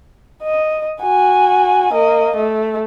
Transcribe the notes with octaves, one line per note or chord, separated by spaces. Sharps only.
D#5
F#4 G#5
A#3 D#5
A3